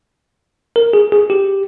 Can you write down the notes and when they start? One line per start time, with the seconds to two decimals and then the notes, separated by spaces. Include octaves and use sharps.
0.76 A#4
0.93 G#4
1.12 G#4
1.30 G4